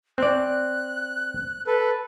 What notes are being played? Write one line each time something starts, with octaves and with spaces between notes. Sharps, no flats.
C4 D5 F#6
A4 B4